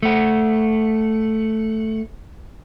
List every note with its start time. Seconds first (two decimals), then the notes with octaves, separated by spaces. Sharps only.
0.03 A3 F#5